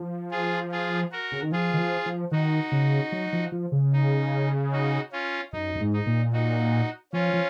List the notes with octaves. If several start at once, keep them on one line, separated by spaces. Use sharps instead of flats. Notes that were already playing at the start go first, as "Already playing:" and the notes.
Already playing: F3
F4 G#4
F4 G#4
F#4 A#4
C#3
D#3
F3 F4 G#4
D#3
F3
F3
D#3 D#4 F#4
C#3
F#3
F3
F3
C#3
D#4
D#4 F#4
C#4 F4
F#2 D#4
F#2
G#2
D#4
A#2
D#4 F#4
F3 C#4 F4
F3